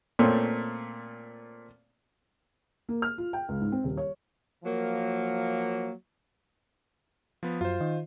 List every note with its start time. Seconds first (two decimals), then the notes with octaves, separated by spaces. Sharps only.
0.19 A#2 A3 C4 C#4
2.89 A#3
3.02 F6
3.18 F4
3.33 G5
3.48 C#2
3.61 G#2
3.72 C4
3.84 D#1
3.97 C#5
4.64 F3 F#3 A#3
7.43 F3 B3
7.61 F#2 F4 C5
7.81 D#3